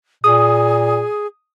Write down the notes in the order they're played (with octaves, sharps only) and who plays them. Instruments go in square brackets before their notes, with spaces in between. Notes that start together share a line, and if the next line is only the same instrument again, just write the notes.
[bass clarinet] A#2 [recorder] G#4 [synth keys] D#6